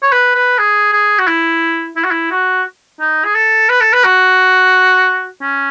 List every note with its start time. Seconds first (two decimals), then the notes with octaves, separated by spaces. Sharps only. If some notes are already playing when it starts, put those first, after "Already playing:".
0.03 C#5
0.12 B4
0.35 B4
0.58 G#4
0.93 G#4
1.18 F#4
1.27 E4
1.96 E4
2.04 F#4
2.11 E4
2.31 F#4
3.00 D#4
3.25 G#4
3.35 A4
3.69 B4
3.81 A4
3.93 B4
4.04 F#4
5.42 C#4